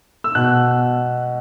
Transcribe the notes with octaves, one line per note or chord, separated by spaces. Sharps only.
E6
B2 F#6